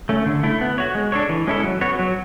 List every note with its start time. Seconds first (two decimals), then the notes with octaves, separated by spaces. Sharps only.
0.09 A3 C#4
0.26 D3
0.43 A3 E4
0.61 B3
0.78 F#4 C#5
0.95 G#3
1.12 D4 A4 C#5
1.29 E3
1.47 G#3 C#4 E4 A4
1.64 F#3
1.81 B3 F#4 C#5
1.99 F#3